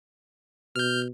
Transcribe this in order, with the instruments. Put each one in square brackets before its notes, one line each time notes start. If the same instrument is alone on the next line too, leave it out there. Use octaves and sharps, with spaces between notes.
[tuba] B2 [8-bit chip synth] F6 G6